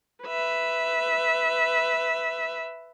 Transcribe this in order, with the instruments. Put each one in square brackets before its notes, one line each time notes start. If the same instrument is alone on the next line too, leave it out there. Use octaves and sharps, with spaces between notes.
[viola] B4 E5